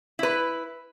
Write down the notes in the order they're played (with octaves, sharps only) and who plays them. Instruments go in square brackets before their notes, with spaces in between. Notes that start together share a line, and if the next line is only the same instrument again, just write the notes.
[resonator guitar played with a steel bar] E4 B4